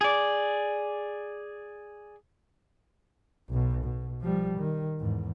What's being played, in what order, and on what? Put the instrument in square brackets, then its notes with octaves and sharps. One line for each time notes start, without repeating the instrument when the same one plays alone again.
[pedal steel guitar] G#4 D5
[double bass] B1 B2
B2
F3 G3
D#3
E2 G#2